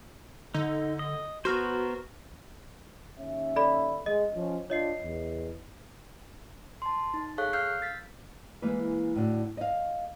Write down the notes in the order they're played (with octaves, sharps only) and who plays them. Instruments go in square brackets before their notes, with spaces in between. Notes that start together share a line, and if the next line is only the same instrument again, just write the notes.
[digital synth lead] D3 [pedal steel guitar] D#4
[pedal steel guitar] D#5
[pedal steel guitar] B3 A#4 C5 [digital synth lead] F#4
[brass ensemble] D#2 C#4 E5
[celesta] A4 D5 B5
[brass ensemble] G#3 [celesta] D#5
[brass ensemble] F3 C#4
[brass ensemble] D4 F4 [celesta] C#5 D#5 C7
[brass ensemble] E2
[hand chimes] A5 C6
D#4
G#4 A4 C#5 F5 C#6 F#6
F5 E6 F6 G6 C7
G6 A6 B6
[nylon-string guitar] E3 G#3 A#3 E4 B4
A2 D3 F#4
D#5 F5